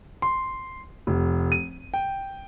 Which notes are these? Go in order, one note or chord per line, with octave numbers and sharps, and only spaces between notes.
C6
F1
D#7
G5